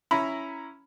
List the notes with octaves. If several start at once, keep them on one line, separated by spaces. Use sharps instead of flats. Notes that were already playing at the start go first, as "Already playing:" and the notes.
C#4 E4 A#5 B5